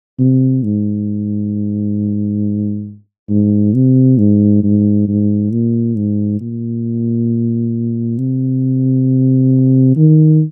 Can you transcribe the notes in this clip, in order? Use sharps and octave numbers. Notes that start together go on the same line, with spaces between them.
C3
G#2
G#2
C3
G#2
G#2
G#2
A#2
G#2
A#2
C3
D#3